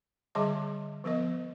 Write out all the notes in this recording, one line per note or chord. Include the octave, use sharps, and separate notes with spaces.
D3 G3 G#4 D#5 E5 D6
F3 B3 A#4 D#5